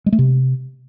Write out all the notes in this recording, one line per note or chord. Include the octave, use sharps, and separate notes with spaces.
G#3
A3
C3